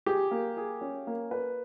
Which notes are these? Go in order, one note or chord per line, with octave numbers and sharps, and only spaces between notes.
G4 G#4
A#3
G#4
C#4
A#3
B4